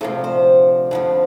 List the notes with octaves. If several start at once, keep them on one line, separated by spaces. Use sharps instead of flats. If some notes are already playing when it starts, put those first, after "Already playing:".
D2 C3 F3 A4
C5
F2 D3 F3